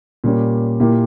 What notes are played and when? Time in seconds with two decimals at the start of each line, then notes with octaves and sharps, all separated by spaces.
0.24 A#2 G3 C#4
0.80 A#2 A#3 E4 G4